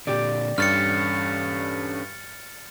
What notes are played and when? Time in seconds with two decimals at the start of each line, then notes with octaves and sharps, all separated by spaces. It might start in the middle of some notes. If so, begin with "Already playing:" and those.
0.07 A#2 D3 G4 D5
0.58 G2 C#4 A4 C#5 F6 A6 C#7